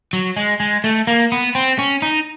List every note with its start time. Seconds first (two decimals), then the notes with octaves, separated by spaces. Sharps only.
0.13 F#3
0.37 G#3
0.60 G#3
0.84 A3
1.07 A#3
1.32 B3
1.55 C4
1.79 C#4
2.02 D#4